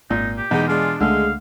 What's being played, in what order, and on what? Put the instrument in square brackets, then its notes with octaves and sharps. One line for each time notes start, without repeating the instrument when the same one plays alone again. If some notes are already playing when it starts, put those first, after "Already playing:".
[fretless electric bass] G#1 [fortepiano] A#2 [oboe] D#4
[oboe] G4
[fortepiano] E2 [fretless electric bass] B2 [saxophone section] G#3 D#4
[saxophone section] G#3 D4 [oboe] F4
[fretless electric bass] C#2 A3 [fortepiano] D3 [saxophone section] G#3 [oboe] F5